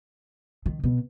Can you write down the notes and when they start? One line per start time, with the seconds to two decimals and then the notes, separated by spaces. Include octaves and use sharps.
0.66 D#3
0.84 B2